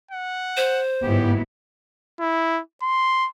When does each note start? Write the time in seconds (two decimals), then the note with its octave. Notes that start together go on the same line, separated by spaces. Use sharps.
0.11 F#5
0.57 C5
1.03 G1 G#2 F#3 B3 E4 G4
2.20 E4
2.82 C6